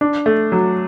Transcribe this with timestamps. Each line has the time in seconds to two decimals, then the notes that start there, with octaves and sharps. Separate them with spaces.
0.01 D4
0.26 A3
0.52 F#3